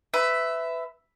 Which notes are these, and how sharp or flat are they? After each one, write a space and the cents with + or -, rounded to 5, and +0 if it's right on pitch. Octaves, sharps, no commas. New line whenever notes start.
B4 +25 E5 +0